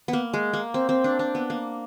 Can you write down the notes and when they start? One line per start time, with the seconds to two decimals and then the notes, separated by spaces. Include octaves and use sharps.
0.08 B3
0.13 A#3
0.34 G#3
0.53 A#3
0.74 C4
0.89 C4
1.04 D4
1.19 D4
1.35 B3
1.50 A#3